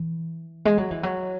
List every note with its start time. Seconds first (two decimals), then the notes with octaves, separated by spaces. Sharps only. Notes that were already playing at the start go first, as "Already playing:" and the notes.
Already playing: E3
0.65 G#3
0.78 F#3
0.91 E3
1.03 F#3